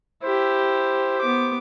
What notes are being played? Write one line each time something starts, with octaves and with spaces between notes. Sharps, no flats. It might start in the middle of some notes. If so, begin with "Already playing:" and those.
E4 G4 C5
B3 D6